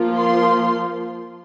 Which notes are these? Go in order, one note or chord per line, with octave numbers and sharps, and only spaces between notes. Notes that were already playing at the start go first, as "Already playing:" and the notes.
Already playing: F3 A#3 F4
C6